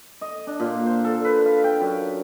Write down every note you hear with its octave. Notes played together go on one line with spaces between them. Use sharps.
D#5
D4
A#2
C5
A4
B4
F5
G5
F#2